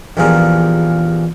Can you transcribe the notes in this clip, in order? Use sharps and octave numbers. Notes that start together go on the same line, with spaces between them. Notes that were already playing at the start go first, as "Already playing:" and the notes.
A#1 E2 F3 G3 G#4 A#4